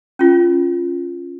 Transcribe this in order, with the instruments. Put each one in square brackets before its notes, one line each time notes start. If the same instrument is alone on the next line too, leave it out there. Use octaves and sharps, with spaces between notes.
[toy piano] C#4 F4